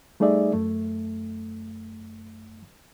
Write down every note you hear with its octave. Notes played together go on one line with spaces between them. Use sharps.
G3 A3 D#4 G#4 D5 E5
F#2 A3